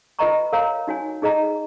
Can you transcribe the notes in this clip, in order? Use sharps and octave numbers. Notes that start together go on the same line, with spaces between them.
F4 B4 D#5 A#5 C#6
A#4 C#5 F5 A#5
D#4 F#4 C#5 G#5
D#4 G#4 D#5 A#5